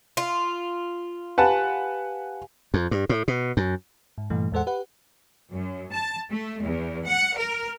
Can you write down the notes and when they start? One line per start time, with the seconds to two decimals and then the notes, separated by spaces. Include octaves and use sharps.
0.17 F4
1.38 G4 B4 F5 F#5 G#5 A5
2.74 F2
2.91 G2
3.09 A2
3.28 B2
3.57 F#2
4.18 G#2
4.30 G2 A#2 E3 A3
4.52 E2 A2 G#3 A4 C5 F#5
4.67 G4 B4 F#5
5.52 F#2
5.92 A5
6.29 A3
6.62 E2
7.06 F#5
7.35 A#4